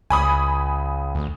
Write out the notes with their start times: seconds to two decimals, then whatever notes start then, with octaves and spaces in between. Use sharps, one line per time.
0.10 C#2 G#5 B5 D#6
1.15 D2